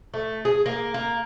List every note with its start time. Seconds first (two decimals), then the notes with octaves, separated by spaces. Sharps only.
0.14 A3
0.45 G#4
0.66 A#3
0.94 A#3